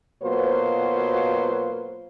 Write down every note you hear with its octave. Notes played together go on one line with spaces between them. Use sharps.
B2 F#3 A#3 F4 B4 C5